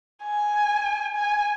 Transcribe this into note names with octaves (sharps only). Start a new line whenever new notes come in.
G#5
G#5